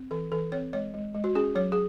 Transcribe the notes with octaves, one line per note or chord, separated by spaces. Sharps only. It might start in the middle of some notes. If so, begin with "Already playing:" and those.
Already playing: C4
E3 A4
E3 A4
C4 C#5
G#3 C#5
G#3
G#3
F#4
C#4 G#4
F#3 C#5
G#4